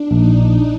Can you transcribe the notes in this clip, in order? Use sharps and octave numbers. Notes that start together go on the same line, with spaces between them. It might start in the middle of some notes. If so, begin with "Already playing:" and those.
Already playing: D4
A#1 D#4